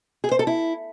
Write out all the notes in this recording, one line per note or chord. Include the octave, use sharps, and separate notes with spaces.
G#4
C5
A4
E4